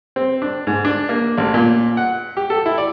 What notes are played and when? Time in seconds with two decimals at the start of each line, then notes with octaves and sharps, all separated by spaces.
0.16 C4
0.42 D4
0.67 G#2
0.85 D4
1.09 A#3
1.38 A1
1.54 A#2
1.97 F#5
2.37 G4
2.50 A4
2.66 E4
2.78 D5